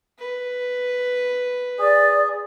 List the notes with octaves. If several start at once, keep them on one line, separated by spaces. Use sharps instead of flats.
B4
G#4 D5